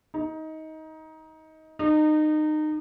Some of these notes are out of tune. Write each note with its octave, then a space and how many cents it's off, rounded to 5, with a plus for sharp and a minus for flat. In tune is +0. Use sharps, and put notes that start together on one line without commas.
D#4 +20
D#4 -25